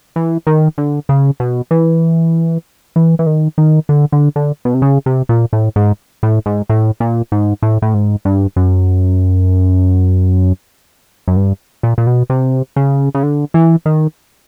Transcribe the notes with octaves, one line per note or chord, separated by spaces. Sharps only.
E3
D#3
D3
C#3
B2
E3
E3
E3
D#3
D#3
D3
D3
D3
B2
C3
C#3
C3
A#2
A2
G#2
A2
G#2
A2
A#2
G#2
A2
A2
G#2
G2
F#2
F#2
G2
A#2
A#2
B2
C3
C#3
C#3
D3
E3
D#3